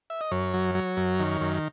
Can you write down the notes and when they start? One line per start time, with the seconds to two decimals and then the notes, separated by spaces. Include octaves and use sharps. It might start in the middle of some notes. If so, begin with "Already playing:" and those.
0.10 E5
0.21 D#5
0.31 F#2 C#5
0.54 F#3
0.75 F#3
0.97 F#2
1.19 D#3
1.41 F#2